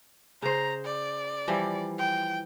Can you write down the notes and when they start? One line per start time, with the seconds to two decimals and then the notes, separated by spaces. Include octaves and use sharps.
0.42 C#3 C5 A#5
0.85 D5
1.48 E3 F3 G3
1.99 G5